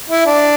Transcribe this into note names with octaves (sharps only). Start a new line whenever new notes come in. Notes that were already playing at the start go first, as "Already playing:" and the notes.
E4
D4